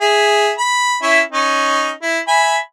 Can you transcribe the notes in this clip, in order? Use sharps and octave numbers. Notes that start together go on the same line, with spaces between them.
G#4 E5
B5
C#4 E4 E5
C#4 D#4
E4
E5 G#5 B5